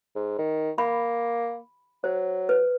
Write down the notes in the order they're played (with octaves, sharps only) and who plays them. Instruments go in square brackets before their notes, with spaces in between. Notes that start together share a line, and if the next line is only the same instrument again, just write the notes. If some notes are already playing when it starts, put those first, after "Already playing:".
[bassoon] G#2
D#3
[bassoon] A#3 [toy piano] B5
[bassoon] F#3 [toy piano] C5
[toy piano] B4